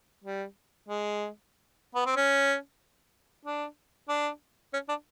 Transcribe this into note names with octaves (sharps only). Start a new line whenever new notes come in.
G3
G#3
B3
C4
C#4
D4
D4
C#4
D4